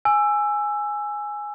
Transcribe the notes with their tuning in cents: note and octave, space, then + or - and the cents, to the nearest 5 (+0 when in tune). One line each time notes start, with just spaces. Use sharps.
G#5 +0 E6 +10